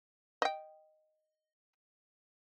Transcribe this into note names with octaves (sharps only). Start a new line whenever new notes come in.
D#5 G5